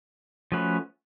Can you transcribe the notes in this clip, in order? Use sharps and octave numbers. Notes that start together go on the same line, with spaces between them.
F3 A3 C#4 F#4 B4